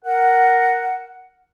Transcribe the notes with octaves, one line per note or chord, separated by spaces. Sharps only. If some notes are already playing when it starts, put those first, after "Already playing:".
A#4 F#5